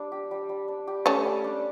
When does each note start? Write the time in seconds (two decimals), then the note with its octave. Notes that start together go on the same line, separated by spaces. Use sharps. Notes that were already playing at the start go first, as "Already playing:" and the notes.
Already playing: G3 D4
0.12 G4
0.31 G3
0.49 G3
0.68 D4
0.87 G4
1.06 G3 A3 C#4
1.25 G3
1.44 D4